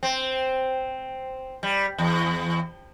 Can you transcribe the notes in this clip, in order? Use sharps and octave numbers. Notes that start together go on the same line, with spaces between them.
C4
G3
E2